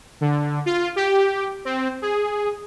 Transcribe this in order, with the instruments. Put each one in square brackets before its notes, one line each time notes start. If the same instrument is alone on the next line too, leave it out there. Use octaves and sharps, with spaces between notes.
[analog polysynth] D3
F4
G4
C4
G#4